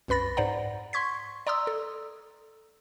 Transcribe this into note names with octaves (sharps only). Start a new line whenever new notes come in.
C2 F#2 B4 B5 A6 A#6
G#2 C5 D5 F#5 A#5
C6 C#6 G#6 B6
D5 A#5 C6 D#6 E6
A4